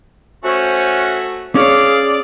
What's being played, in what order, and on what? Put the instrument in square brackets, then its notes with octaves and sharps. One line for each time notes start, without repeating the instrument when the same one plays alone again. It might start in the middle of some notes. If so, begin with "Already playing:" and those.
[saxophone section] A3 F#4 [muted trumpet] C#4 [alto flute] C5
[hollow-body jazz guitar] C#4 C#5 [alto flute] G#4 [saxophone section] D5 [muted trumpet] F5